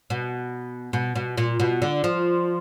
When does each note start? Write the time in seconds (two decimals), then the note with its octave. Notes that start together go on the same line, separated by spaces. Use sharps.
0.10 B2
0.93 B2
1.15 B2
1.37 A#2
1.60 B2
1.82 D3
2.04 F3